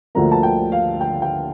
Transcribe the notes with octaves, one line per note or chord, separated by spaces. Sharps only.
D2 D3 F3 A#3 A#5
A5
G5
F5
G5
G5